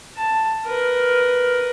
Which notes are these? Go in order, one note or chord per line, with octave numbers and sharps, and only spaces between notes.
A5
A#4 B4